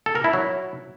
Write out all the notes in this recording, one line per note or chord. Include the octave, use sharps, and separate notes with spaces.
A4
A#4
E4
F#3